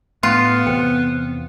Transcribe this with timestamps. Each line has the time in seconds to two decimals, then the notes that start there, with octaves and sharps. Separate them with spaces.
0.23 A2 B3 F4 G5 C6
0.67 E2 C3 C5 G5